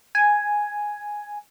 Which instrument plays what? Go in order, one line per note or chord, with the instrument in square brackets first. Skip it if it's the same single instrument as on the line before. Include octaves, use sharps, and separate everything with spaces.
[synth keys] G#5